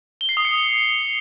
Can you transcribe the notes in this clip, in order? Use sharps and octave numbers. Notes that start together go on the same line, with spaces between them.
G7
C7
D#6
C#7